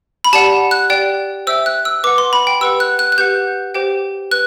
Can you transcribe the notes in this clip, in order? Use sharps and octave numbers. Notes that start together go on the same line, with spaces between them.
B5
G4 D5 F#5 A5
F#6
G4 D5 G5
C5 E5 G5 E6
F#6
E6
B4 F#5 D6
C6
B5
G5
G4 B4 F#5 E6
F#6
F#6
F#6
G4 B4 F#5 G6
G4 C5 G5
B4 F#6